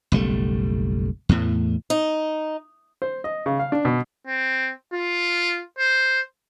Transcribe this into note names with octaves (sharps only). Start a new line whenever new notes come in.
F#1 B1 G3 A3
E2 A2
D#4
C5
D#5
C#3
F5
D4
B2
C4
F4
C5